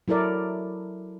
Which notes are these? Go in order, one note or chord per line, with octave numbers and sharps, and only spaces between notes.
F#3 E4 A4 A#4 D5